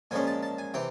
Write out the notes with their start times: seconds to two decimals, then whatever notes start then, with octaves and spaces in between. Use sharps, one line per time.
0.11 A#2 F3 G#3 C#4 G#5
0.27 A5
0.43 A5
0.58 G#5
0.74 C3 E3 G5